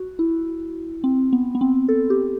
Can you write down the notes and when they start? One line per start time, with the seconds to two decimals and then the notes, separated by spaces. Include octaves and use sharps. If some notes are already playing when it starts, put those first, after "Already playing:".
Already playing: F#4
0.19 E4
1.04 C4
1.33 B3
1.55 B3
1.61 C4
1.89 A4
2.10 G4